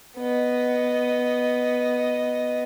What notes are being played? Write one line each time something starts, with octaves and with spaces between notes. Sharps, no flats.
B3 D#5